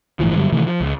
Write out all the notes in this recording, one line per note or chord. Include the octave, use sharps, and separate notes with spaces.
G1 A2 E3 F3
G2 D3 F#3 G3
C3 D#3 E3 A3
F3
C#2